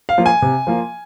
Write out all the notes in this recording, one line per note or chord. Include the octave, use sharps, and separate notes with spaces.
F5
F3 A#3 F4
G#5
C3
F3 A#3 F4